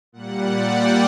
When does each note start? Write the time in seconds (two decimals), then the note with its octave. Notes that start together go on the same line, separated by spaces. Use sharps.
0.12 A#2 G3 F#5
0.42 D5
0.71 G5